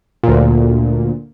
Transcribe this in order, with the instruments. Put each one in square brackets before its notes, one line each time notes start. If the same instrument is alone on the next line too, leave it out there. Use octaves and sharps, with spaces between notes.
[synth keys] D2 A#2